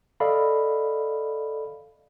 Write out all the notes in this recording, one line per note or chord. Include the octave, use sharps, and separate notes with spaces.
A4 D5 D#5 F5 B5